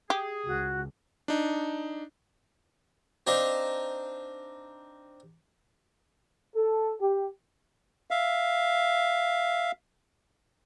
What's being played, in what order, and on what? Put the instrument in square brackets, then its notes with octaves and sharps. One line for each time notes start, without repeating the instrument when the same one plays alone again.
[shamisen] G4 [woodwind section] G#4
[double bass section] C#2 [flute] F#4
[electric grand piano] D4 D#4
[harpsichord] C4 D4 D#4 D#5 F5
[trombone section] A4
G4
[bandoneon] E5 F5